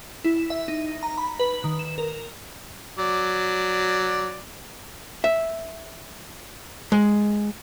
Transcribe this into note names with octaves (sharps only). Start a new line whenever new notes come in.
E4
E5
D#4
A#5
B5
B4
D#3
E7
A#4
F#3 D5
E5
G#3